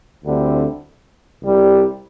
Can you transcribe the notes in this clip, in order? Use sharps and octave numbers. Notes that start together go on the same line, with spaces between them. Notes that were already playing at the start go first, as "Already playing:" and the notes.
D2 D3 G3 C4 E4
C2 C3 G3